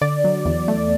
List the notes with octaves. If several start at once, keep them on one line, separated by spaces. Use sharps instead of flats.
D3 D5
F#3
E2
A3